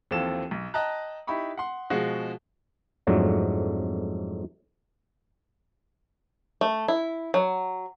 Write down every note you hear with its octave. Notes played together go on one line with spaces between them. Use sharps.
D#2 E3 F3 C4 A4 E7
B1
D#5 G5 A5 A#5 F#6
D#4 E4 G4 B5 C#6
F#5 C6
B2 F3 G#3 F#4
F2 G#2 F#3 A3 D4
A3
E4
F#3